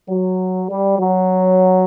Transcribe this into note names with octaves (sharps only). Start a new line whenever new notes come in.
F#3
G3
F#3